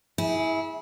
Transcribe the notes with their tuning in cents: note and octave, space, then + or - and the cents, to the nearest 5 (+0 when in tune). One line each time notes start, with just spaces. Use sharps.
E4 -25 G#4 +0